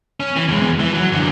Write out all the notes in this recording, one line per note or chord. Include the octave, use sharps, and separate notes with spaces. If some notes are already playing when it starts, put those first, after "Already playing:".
C#4
E3
E2 G#3
E3
F#3
F#2 D3